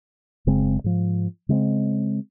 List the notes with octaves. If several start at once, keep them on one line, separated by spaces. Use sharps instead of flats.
F#1 C#3 G#3 C4
G#2 F3
C#3 G#3 A#3 C4